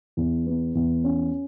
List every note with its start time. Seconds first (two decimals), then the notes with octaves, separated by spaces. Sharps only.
0.17 E2
0.47 B3
0.75 E2
1.04 C#4